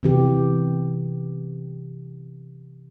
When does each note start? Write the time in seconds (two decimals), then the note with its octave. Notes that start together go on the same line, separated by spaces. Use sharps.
0.03 C3 E3 G4